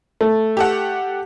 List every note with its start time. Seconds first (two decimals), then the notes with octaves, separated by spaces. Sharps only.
0.21 A3
0.57 G4 A4 F#5